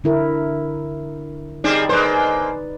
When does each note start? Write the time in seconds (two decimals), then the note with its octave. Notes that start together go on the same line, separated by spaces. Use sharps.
0.04 D3 E4 A#4
1.64 G3 C4 D#4 G#4 D5
1.89 G#3 A#3 B4 C5 D5